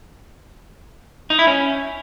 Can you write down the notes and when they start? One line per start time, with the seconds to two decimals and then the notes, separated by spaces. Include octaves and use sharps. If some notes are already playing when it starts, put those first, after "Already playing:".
1.30 D#4
1.39 E4
1.47 C#4